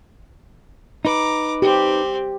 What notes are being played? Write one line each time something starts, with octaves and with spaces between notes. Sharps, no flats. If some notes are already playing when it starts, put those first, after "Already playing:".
D#4 B4 A#5 D6
C4 G4